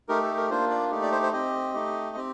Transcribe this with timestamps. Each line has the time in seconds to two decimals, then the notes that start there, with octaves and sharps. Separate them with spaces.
0.09 A3 D#4 G4 A#4
0.23 A4
0.37 A#4
0.50 A#3 D4 F4 C5
0.70 D5
0.91 A3 D#4 G4
1.03 D5
1.12 C5
1.23 C5
1.33 C4 G4 D#5
1.74 A3 D#4 G4
2.16 C4 G4